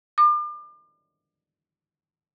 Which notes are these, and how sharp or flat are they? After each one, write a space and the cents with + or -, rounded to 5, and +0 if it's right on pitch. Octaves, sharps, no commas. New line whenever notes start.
D6 +35